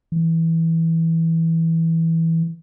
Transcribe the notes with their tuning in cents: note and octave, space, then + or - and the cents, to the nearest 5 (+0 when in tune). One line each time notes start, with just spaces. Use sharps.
E3 -10